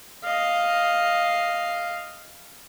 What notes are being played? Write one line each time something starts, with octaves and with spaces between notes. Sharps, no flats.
D#5 F5